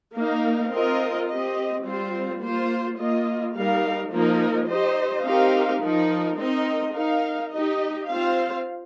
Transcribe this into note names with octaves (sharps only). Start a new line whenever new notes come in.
A#3 D#4 A#4 F5
C4 F4 A#4 D#5
C4 G4 D#5
G3 C4 F4 C5
A#3 F4 C5
A#3 F4 D#5
G3 D#4 A#4 F5
F3 A#3 D#4 A#4
D#4 G4 C5 D#5
C4 D#4 G4 A#4 F5
F3 D#4 A#4
C4 D#4 A#4 D#5
D#4 A#4 F5
D#4 G4 D#5
C4 F4 C5 F5